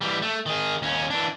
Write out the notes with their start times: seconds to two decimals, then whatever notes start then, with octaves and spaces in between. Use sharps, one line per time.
0.01 E3 G3
0.22 A3
0.46 D#3 G#4
0.82 D#2 C#4
1.10 E3 D4